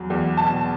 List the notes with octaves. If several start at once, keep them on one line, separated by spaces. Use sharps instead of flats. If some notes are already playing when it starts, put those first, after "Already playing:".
Already playing: E2 F#3
E2
B2 A5